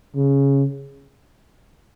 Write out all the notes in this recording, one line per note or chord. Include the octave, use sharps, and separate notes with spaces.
C#3